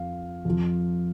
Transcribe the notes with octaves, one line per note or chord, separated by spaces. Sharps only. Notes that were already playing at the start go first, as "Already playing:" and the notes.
Already playing: F2 F3 F5
F2 F3